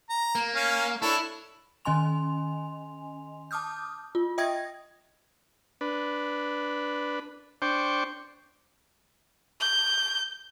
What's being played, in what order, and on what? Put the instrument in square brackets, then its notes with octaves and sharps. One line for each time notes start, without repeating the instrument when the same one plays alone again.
[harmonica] A#5
[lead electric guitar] A#3
[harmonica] C#4 F5
[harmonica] D4 A4 C#5 [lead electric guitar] E4
[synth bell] D#3 C#4 D#5 G#5 C6 F7
A5 D6 D#6 F6 G6
F4
D#5 E5 G5 D#6 G#6 A#6
[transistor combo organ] D4 B4
D4 C5 G5 C#6 D6
[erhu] G6